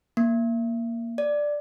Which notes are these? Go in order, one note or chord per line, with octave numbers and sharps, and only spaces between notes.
A#3
D5